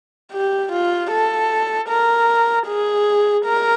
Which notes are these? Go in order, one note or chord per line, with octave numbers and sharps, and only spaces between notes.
G4
F4
A4
A#4
G#4
A#4